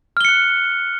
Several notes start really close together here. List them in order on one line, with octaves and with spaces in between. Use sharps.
F6 G7 C#7 F#6